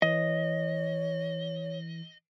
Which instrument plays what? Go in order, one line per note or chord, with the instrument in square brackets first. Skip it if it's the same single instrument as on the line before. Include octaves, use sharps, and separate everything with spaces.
[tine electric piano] E3 [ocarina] C#5 [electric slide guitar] D#5